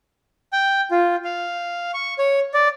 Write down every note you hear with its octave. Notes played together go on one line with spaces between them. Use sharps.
G5
F4
F5
C#6
C#5
D5